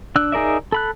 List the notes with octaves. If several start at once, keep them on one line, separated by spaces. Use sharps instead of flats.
D4 E6 F#6
D#4 G#4 A#4 D5 E5
A4 B5 F#6